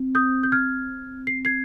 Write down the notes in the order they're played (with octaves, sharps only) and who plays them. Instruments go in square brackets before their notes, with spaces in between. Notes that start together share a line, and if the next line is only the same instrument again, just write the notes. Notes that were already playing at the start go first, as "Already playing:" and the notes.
Already playing: [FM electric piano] C4
[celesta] D#6 G6
G6
F6 G#6
C7
G#6 C7